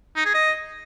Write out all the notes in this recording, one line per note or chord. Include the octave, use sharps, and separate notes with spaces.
D#4
G#4
D#5